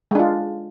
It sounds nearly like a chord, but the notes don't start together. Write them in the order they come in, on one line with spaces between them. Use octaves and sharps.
G#3 D4 F4